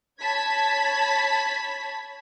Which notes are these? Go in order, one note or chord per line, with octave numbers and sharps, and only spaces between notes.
C#5 A5 B5 G#6 B6